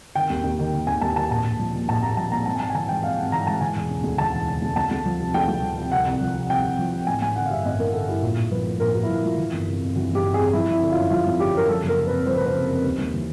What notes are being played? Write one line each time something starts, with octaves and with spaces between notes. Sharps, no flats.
D#3 G5
D#2
D#2
D#3
D#3
D#2 G#5
D#2 A5
D#3 A5
A#1 A5
A#1
F3
A#2
A#1 A5
A#1 A#5
F3 A5
A#2 A#5
G#1 A5
G#5
G#1 A5
G#5
E3 A5
G#2 G5
G#1 F5
G#1 F#5
E3 A#5
G#2 A5
E3 G#5
E1
C#3
D2
E3 A5
E1
C#3
D2
D2 A5
D2
F3
C3
D2 G5
D2
F3
C3
C2 F#5
C2
F3
C3
C2 G5
C2
F3
C3
A1 G#5
A1 G#5
D3 F#5
F5
G2 E5
A1 D#5
A1 A#4
D3 A4
G2 E4
A#1 F4
A#1
F3 B4
A2
A#1 A#4
A#1 F#4
E4
F3 F4
A2 F4
E3
G1
C3
F2
E3 F#4
G1 G4
C3
F2 G#4
F3 E4
G#1 E4
D3
F#2 F4
F3 F4
G#1
D3 G4
F#2 A#4
F3 A4
F#1
A#4
C3
B4
F2
F3 C5
F#1 B4
C5
C3
F2
D#2
D#2
E3